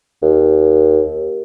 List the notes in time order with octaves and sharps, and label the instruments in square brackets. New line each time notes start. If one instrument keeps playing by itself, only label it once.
[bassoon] D#2